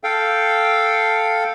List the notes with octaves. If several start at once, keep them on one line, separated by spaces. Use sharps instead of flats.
A4 F5 G5